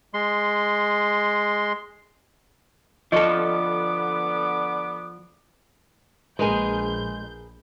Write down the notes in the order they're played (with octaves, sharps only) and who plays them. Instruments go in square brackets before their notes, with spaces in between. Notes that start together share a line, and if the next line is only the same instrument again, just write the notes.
[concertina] G#3 C6
[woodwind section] D3 B3 D6 [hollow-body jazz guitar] F3 A4 [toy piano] D#5 C#6
[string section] A#1 G6 [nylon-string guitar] G#3 [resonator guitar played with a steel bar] G#4 A#4 B4